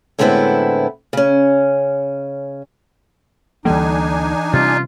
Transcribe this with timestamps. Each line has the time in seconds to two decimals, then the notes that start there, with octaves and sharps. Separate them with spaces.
0.19 A2 D3 G#3 B3 C4 E4
1.13 C#3 C#4
3.65 D2 E3 G3 A#3 D4 D#4 G#5
4.53 C3 G3 C#4 F4